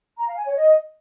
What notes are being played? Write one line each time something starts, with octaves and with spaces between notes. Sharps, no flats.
A#5
F5
G#5
C#5
D#5